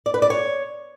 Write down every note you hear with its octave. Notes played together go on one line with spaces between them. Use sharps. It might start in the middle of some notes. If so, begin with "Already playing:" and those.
D5
B4
D5
C#5